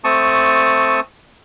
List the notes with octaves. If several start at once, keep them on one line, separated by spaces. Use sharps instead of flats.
A3 C4 A5 C#6 D#6